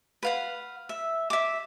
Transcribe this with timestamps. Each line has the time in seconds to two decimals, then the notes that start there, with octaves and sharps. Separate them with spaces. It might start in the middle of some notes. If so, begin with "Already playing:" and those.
0.23 B4 F5 F#5
0.89 E5
1.30 E5 D6